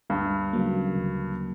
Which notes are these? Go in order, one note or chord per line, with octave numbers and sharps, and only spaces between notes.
D2 G2
C#3 F#3 A#3
D2